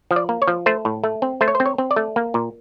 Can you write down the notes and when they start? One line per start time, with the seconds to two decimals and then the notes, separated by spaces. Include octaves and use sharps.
0.11 F3
0.16 D5
0.29 A#3
0.42 C#5
0.47 F3
0.66 A3 C5
0.85 A2
1.04 A3
1.22 C4
1.41 A3 C5
1.48 C#5
1.55 C5
1.60 C4
1.66 C#5
1.78 C4
1.91 D5
1.96 A3
2.16 A#3
2.34 A#2